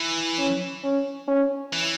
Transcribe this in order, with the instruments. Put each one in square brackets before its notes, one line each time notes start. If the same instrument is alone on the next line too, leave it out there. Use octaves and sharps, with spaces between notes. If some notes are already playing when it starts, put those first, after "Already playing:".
Already playing: [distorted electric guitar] E3
[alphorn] C#4
C#4
C#4
[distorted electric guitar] E3